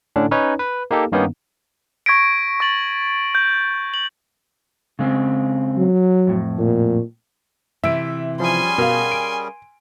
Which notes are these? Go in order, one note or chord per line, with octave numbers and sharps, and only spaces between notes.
A2 D3 C#4 D4
C#4 D#4 B4 C#5
B4
A#3 D#4 G4 A4
G2 D#3 A#3 B3 C#4 D#4
C#6 G#6 A#6 B6 D7
C#6 A6 F#7
G6
F#7
C#3 G#3 C4
F#3
F2 A2
A#2
C3 E3 E4 E5 E6 D7
F3 G3 C#4 G#4 G#5 C6
B2 A#4 F5
D7